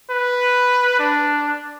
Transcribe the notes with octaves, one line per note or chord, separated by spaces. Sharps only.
B4
D4